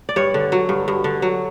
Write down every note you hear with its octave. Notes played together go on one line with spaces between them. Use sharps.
D5
G2 C#5
D3
F#3
G2
G2
D3
F#3